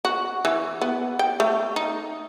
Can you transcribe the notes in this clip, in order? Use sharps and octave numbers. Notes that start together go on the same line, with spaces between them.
F#4
E3
B3
G5
A3
D#4